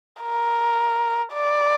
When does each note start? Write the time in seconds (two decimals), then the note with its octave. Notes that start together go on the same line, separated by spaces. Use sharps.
0.21 A#4
1.33 D5